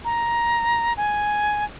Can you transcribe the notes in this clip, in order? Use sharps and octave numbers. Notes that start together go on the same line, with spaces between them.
A#5
G#5